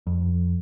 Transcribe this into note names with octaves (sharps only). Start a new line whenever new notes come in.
F2